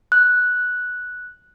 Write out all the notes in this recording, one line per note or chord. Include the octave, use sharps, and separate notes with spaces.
F#6